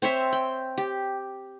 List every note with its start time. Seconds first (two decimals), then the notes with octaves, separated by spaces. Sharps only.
0.02 C4 C5 C#5 E5
0.32 G5
0.78 G4